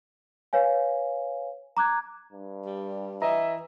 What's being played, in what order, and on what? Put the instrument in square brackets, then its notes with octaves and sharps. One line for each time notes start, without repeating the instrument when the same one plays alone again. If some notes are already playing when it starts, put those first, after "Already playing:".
[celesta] B4 C#5 F5 G#5
A#5 D6 F#6 G#6
[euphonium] G2
[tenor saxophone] G3
[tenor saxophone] E3 [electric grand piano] D#5 A#5 [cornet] E5